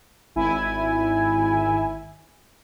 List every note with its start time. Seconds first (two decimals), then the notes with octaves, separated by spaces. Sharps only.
0.36 G#1 E4 G#5